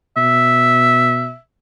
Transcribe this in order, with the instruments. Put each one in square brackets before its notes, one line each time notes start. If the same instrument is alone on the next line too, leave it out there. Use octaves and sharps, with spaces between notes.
[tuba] B2 [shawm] E5